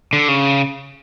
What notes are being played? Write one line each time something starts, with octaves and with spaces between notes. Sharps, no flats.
D3
C#3